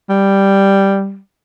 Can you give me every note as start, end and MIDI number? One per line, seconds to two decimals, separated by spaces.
0.09 1.18 55